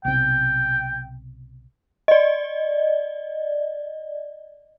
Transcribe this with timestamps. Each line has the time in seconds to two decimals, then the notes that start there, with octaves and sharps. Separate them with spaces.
0.05 B1 C3 G5
2.08 D5 D#5